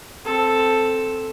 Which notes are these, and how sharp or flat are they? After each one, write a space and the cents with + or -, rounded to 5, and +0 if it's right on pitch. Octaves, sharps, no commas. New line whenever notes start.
C4 +0 A4 +0